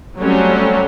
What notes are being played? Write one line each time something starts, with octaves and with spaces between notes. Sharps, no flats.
F#3 G3 A3 C4 C#4